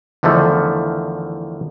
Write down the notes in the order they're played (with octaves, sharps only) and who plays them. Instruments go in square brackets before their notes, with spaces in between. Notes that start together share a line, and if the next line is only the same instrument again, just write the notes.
[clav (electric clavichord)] E2 D3 D#3 F3 A3